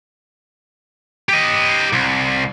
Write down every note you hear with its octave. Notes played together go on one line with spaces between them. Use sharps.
G4 D#5
C2